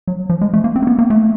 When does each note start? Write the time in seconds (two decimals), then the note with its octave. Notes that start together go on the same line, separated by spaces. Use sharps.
0.07 F#3
0.30 F3
0.41 G#3
0.54 A3
0.64 A#3
0.76 C4
0.82 A#3
0.87 B3
0.99 A#3
1.10 A3